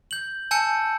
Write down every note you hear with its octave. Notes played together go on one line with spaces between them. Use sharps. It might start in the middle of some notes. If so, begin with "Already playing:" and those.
G6 F#7
G#5 A5 E6 G6 C#7